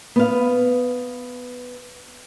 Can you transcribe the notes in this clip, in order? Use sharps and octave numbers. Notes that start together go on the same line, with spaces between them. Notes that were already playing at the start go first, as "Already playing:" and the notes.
B3 F5